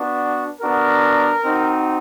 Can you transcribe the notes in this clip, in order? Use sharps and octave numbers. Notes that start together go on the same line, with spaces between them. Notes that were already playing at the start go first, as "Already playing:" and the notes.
Already playing: B3 D4 F#4
B3 D4 F#4 A#4
C4 D#4 F#4